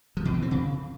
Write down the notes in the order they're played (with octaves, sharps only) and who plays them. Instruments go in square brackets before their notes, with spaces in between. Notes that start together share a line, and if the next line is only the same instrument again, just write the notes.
[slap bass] F3
B2
E3
C4
C#3